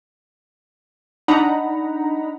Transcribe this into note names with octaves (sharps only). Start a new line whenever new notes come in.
D4 D#4 F#5 A#5 B5